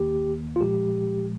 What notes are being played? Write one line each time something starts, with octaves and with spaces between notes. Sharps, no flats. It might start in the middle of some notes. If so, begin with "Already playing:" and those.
Already playing: D#2 D#3 A#3 G4
F4
A#2 F3 G#3 G4